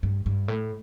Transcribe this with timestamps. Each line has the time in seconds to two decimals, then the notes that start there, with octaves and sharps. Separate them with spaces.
0.03 G2
0.26 G2
0.48 A2